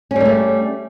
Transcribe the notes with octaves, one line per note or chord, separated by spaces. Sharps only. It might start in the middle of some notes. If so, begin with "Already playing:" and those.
G3 A3 A#3 C#4